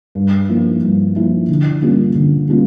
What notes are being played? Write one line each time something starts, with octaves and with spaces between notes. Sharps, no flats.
G2
F3 A#3 E4
G2
F3 A#3 E4
D3
G3 A#3 C#4 F4
D3
G3 A#3 C#4 F4